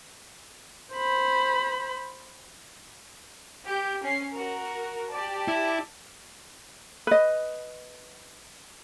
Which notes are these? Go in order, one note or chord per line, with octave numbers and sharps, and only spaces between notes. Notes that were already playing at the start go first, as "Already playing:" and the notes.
C5 B5
G4 G6
C#4 C7
F#4 A#4
G4 D5 A5
E4
B4 D#5